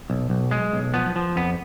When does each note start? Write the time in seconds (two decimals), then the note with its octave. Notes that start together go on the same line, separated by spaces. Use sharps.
0.10 B1
0.30 B1
0.51 G#3
0.73 B1
0.94 F3 B3
1.16 F3
1.36 F2 B3